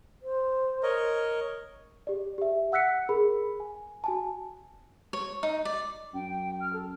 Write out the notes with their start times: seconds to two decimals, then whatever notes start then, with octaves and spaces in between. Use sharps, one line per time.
0.22 C5
0.83 A#4 C#5 D#5
2.07 G4 D5
2.38 G4 E5
2.72 F#5 E6 F#6 B6 C#7
3.09 G#4 A#4 B5
3.60 G#5
4.04 F#4 G#5 A5
5.13 C#5
5.43 D#4
5.65 D5
6.14 F#2 G5
6.60 F6
6.73 A4